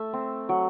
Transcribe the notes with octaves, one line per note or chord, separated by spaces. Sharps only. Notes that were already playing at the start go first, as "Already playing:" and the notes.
Already playing: A3 E5 E6
C4
F#3